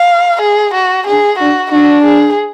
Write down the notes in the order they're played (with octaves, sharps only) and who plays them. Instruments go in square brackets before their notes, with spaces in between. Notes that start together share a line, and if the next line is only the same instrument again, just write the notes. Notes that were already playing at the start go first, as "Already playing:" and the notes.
Already playing: [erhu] F5
G#4
F#4
[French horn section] D4 [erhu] G#4
[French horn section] D4 [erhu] F#4
[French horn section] D4 [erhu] F#4
[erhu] G#4